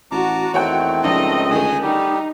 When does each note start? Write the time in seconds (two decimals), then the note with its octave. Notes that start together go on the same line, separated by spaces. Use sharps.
0.11 A1 F#4 A5 A#5 D6
0.54 E2 D#3 A3 C4 C#5 F#5 G5
1.04 C#2 F3 D4 D#4 D#5
1.51 D3 D#3 A3 G#4 G#5 D#6
1.82 G3 D#4 G4